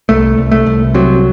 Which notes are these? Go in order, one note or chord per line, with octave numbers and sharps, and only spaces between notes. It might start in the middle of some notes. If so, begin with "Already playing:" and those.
C2 A3
C2
A3
C2
C3 F#3